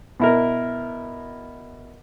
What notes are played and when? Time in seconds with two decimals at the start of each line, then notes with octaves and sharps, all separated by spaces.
0.20 B2 E4 A#4